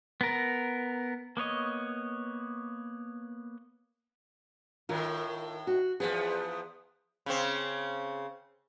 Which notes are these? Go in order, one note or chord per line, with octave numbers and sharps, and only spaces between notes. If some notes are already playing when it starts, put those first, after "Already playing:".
B3 A#4
A#3 B3 C#5 D#5
A2 D#3 F4 A#4
F#4
E2 F3 B3 G#4
C#3 C4